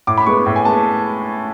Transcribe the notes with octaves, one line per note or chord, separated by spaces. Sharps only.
A2 D6
B5
G#3 B3 C#6
A2
G#5
G#3 B3 A5